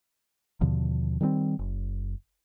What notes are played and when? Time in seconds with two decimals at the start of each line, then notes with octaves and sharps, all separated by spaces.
0.61 D#2 B2 D3 F3
1.21 D#3 G3 G#3 C4
1.59 F#1